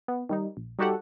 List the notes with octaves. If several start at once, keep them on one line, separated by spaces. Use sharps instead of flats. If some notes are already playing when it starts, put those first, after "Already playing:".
B3
D#3 G3 D#4
A#1
G3 D#4 F#4 G4 A4 F#5